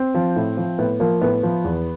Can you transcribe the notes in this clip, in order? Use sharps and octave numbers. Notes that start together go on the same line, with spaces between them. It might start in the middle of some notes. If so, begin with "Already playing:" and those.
Already playing: C4
F3
A2
F3
A2 B3
F3 A#3
A2 B3
F3
E2